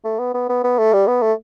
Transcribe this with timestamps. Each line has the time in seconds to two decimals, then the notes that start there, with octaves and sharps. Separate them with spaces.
0.04 A3
0.19 B3
0.34 B3
0.49 B3
0.64 B3
0.78 A3
0.93 G3
1.07 B3
1.22 A3